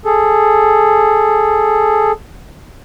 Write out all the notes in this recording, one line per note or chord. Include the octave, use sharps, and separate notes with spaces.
G#4 A4